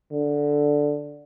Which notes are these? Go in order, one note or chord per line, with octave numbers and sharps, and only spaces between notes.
D3